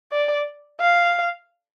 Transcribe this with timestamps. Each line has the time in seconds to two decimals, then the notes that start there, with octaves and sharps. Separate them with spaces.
0.12 D5
0.80 F5